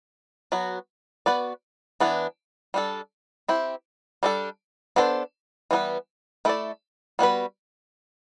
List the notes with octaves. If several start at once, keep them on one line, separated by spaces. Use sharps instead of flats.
F#3 B3 F#4
B3 F#4 B4 D5
E3 B3 D4
G3 D4 A4
C4 E4 G4
G3 D4 A4
B3 D4 A4 C5
E3 G3 B3 E4 B4
A3 E4 A4 D5
G3 B3 F#4 B4